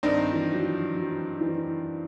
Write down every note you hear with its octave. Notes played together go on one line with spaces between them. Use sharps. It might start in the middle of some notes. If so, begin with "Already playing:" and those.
G2 D#3 G3 C4 D#4
E3
F#3
F3
F#3
E3